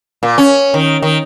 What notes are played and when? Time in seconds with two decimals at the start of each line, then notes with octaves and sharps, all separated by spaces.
0.23 A#2
0.38 C#4
0.74 D#3
1.02 D#3